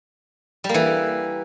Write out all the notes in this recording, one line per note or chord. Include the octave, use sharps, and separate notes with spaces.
G3
A#3
E3